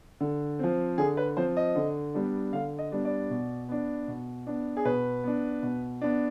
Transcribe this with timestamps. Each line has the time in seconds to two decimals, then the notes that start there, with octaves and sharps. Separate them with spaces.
0.20 D3
0.59 F3 C4
0.98 D3 G#4
1.17 B4
1.37 F3 C4 C5
1.57 D#5
1.76 D3
2.14 G3 B3 D4
2.53 D3 F5
2.78 D#5
2.92 G3 B3 D4
3.05 D5
3.30 B2
3.69 B3 D4
4.08 B2
4.47 B3 D4
4.77 G#4
4.85 B2 B4
5.24 B3 D4
5.63 B2
6.01 B3 D4